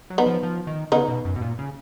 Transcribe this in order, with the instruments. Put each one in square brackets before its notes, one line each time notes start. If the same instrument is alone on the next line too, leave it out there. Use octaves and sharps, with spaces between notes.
[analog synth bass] F#3
[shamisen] B3 D#4
[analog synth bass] F3
F3
D#3
[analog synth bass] C#3 [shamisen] B3 D#4
[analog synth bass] B2
F#2
B2
A#2
C#3